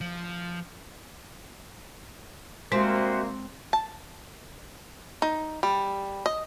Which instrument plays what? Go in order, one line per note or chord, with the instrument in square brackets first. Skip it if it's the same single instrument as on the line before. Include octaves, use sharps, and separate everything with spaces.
[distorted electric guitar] F3
[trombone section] C2 A#3 [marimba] G#3 [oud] C4 [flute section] F#4 C5 E5
[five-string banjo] A5
D#4
G3
D#5